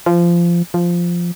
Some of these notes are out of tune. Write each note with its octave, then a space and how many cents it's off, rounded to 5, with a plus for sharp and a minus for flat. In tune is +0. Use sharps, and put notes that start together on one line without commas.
F3 -20
F3 -5